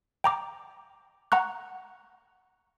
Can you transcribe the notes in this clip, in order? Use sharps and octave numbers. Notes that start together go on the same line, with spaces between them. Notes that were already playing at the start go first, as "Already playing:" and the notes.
G5 A#5 D6
F#5 A#5 C#6 F#6